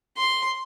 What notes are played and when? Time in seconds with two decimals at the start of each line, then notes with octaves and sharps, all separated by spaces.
0.17 C6